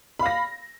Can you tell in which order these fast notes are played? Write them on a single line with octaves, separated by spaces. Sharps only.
B5 F5 A#6